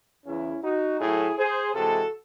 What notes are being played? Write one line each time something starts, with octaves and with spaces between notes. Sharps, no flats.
E2 C#3 E3 C#4 E4
D#4 F#4
A2 F#3 A3 E4 G#4
G#4 C5
C3 E3 G#3 F#4 A4